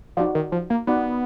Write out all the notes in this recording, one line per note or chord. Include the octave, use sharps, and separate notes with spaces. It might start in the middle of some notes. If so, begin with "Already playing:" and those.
F3 D#4 F#4 D5 F#5
D#3
F3
A#3
B3 D#4 F#4 D5 F#5